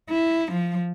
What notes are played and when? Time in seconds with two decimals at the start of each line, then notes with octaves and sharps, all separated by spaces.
0.10 E4
0.53 F3